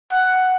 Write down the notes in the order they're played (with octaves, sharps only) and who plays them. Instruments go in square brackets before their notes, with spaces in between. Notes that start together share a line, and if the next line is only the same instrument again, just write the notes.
[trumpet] F#5